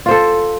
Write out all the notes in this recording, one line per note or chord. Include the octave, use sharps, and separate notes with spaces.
F4 A4 C5